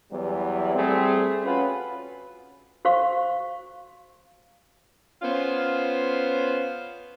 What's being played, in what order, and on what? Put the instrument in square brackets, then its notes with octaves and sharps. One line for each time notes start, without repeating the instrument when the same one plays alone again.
[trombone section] E2 E3 F#3 G3
G3 A3 C4 G#4
C#4 F4 F#4 B4
[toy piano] F#4 C5 F5 C#6
[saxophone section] B3 C#4 F4 C5